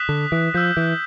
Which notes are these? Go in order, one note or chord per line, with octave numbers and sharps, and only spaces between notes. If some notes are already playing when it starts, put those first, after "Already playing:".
Already playing: D#6 F#6 B6 E7 G7
D3
E3
F3 E6 G6 B6
E3